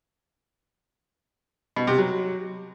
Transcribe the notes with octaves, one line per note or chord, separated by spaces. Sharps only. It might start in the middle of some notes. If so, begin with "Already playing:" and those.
B2
C3
F#3